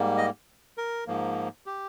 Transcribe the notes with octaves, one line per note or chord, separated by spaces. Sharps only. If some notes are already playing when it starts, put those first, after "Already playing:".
Already playing: G#2 G3 A#3
D#5
A#4
G#2 F3 A#3
G4